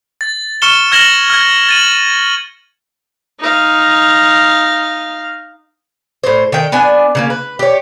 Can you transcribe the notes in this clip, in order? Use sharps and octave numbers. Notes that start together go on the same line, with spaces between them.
A6
C#6 F6 C#7 E7 G7
F6 G#6 A#6 E7 F#7 G7
F6 G#6
A6 D#7 F#7
D#4 F5
A2 C5
D#3 G5
B3 D4 G#5
C#3 F#3 A#3
B4
G4 C#5